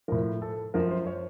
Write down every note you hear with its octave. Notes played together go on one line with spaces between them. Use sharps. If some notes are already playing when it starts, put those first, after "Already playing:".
A2 F3 A#4
A4
F#2 F3 A#4
C5
C#5